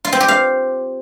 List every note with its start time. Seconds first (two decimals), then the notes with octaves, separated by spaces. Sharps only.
0.05 F4
0.12 C4
0.20 G4
0.28 F5